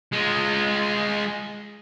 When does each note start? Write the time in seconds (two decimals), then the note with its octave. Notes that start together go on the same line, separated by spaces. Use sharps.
0.13 G#3 F4